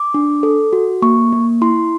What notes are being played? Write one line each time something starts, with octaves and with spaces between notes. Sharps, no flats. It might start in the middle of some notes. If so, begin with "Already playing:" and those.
Already playing: D6
D4
A4
F#4
A#3 C#6
A#3
E4 C6